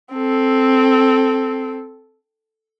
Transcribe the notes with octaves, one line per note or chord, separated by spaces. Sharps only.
C4 A4